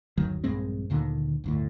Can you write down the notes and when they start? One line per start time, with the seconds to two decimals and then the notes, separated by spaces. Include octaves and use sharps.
0.18 G1 D#2 D#3 F#3
0.44 A#1 G2 G#3 C4
0.90 D2 A#2 D3 D#3
1.44 G1 D2 A2